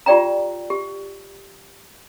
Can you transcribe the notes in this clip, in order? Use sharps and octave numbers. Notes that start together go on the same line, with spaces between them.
F4 G4 D5 G5 A#5
G4